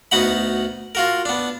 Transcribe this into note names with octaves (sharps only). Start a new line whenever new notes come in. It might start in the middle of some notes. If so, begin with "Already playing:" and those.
D2 B3 D#4 F#4 F#5 B5
F4 F#4 A#4
B3 D4